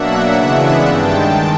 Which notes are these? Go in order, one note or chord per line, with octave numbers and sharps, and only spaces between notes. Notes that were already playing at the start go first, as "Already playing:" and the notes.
Already playing: B2 F#3 A#3 D4 E5 F#5
C#3 E3 G#3 B3 D4
G2 D#3 G#3 G5 A5